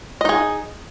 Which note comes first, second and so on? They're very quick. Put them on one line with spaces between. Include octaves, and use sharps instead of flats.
D#5 D#4 G#4